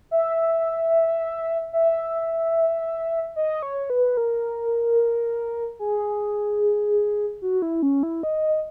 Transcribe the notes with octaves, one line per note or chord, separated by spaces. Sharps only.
E5
E5
D#5
C#5
B4
A#4
G#4
F#4
E4
C#4
E4
D#5